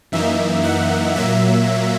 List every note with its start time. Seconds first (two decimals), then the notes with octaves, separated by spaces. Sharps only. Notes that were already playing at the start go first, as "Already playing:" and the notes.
0.12 F#2 E3 A#3 D#4 E5
0.64 F#5
1.16 A#2 F#3 A#3 E5